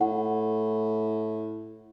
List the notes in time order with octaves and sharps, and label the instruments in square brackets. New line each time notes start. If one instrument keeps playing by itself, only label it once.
[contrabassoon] A2 [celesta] F#5